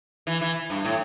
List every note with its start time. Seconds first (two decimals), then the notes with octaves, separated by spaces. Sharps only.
0.27 E3
0.41 E3
0.70 G2
0.84 A2